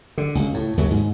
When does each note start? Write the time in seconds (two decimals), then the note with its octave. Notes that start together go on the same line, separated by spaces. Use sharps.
0.18 D3
0.35 C#2
0.54 A2
0.77 D#2 C#3 F#3
0.91 G#2